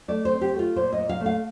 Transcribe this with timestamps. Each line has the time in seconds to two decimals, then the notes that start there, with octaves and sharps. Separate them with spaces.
0.08 A3 D5
0.25 C5
0.30 C4
0.41 G4
0.53 A3
0.59 F4
0.76 A#2 C5
0.93 D#5
0.98 A#2
1.09 F5
1.20 A3
1.26 F5